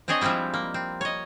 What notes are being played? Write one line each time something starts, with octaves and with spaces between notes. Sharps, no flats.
C4 D4 G#4 C#5 D#5
F3 G3 G#3 C4 E4
A#3
C4
C#5 D#5